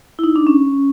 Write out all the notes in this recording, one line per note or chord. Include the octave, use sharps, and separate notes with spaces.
E4
D#4
D4
C#4